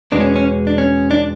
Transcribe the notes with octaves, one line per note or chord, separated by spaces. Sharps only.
E2 B2 G#3 B3 D4
C#4
C#4
D4
C#4
D4